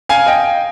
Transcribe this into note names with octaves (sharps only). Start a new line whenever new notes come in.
F5 G#5
D#5 G5